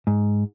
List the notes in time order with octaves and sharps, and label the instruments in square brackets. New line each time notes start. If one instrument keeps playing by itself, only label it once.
[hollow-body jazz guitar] G#2